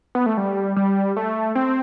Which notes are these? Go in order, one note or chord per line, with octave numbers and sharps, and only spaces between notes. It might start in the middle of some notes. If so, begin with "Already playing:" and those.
B3
A3
G3
G3
A3
C4